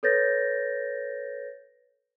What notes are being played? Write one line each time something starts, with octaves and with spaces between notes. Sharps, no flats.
A4 B4 C#5 G6 A6 A#6